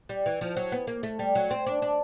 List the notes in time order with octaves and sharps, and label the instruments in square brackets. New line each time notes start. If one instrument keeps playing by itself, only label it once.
[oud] G3
E3
F3
F#3
B3
A#3
A3
G3
F#3
C4
D4
D4